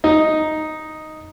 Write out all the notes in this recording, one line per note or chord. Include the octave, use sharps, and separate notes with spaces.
D#4